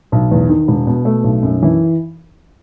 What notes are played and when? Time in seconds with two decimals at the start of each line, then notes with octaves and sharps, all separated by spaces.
0.12 B1
0.31 E2
0.49 D#3
0.68 E1
0.87 B2
1.05 A3
1.24 B1
1.43 F#2
1.62 E3